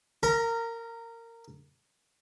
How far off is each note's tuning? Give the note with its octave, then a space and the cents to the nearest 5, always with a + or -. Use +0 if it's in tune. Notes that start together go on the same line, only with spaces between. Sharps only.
A#4 -20 A#5 +25